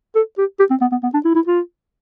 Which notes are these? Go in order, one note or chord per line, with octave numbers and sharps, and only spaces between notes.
A4
G4
G4
C4
B3
B3
B3
D4
E4
E4
F4